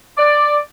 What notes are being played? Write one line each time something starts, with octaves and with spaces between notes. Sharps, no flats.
D5